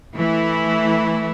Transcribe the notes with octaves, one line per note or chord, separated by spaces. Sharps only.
E3 A3 E4